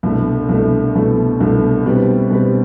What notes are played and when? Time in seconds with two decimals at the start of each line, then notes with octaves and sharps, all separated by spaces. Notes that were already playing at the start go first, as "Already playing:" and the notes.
0.03 C2 B2 A3 D4 A4
0.49 C2 B2 A3 D4 A4
0.95 C2 B2 A3 D4 A4
1.40 C2 B2 A3 D4 A4
1.86 B2 G3 C4 G4 B4
2.30 B2 G3 C4 G4 B4